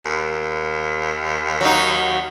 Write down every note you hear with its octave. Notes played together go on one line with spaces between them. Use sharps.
D#2
F#3 D#4